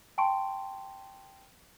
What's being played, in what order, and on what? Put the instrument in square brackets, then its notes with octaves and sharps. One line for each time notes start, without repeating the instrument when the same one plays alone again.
[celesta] G5 A5 C6 C#6 D7